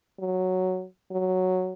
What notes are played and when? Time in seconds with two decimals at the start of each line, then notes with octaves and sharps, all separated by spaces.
0.19 F#3
1.11 F#3